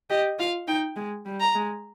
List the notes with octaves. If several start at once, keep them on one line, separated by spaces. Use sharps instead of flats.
G4 D#5
F4 F5
D#4 G5
G#3
G3
A#5
G#3